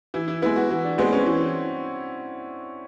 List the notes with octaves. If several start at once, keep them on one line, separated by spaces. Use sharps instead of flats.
E3 E4
E4
G#3 B3 E4
F#4
E3
D4
G#3 B3 C4
C#4
E3